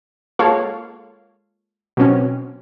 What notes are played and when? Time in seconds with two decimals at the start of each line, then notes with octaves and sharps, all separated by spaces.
0.39 G#3 A#3 F4 A4 C#5 F5
1.97 B2 F#3 C4 C#4